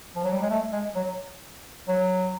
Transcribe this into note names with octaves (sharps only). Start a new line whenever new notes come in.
F3
F#3
G3
G#3
A3
G#3
F#3
F#3